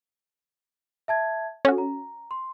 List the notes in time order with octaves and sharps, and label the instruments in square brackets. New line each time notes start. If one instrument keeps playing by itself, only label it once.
[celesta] E5 A5 G#6
[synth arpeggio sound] C#4 F#4 [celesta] A4
[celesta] A#5
C6